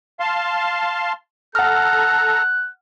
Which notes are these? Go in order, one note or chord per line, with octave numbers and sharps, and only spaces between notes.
F5 A5 C6
A4 F#5 A#5 F6 F#6